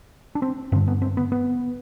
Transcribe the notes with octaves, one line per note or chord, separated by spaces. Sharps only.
D4
C4
G2 D3 C4
B3
C4
B3
B3